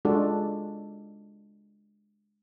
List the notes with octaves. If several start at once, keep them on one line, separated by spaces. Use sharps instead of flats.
G#3 D4 F4 F#4 A4 D5